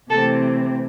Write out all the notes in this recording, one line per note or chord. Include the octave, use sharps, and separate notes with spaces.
C3 E3 A3 C4 A4